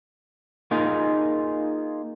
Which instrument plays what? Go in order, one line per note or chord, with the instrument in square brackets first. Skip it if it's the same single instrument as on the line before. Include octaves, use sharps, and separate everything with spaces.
[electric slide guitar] A#3 D#4 F4 G#4